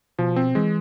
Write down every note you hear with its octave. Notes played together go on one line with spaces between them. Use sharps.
B2 F3
C4
E3 G#3